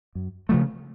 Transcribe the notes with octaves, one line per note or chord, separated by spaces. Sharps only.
F#2
C#3 F3 A3